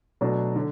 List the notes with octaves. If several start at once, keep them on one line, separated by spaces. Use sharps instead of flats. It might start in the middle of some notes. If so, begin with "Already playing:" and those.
B2 F#3 A3 D4
D3